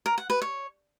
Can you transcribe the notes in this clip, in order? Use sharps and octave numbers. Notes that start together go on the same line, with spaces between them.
A#4
F#5
B4
C#5